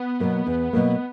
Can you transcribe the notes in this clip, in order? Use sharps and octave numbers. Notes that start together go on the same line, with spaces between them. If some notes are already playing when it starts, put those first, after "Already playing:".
Already playing: B3
B2 F#3 A#3
E2
B2 F#3 A#3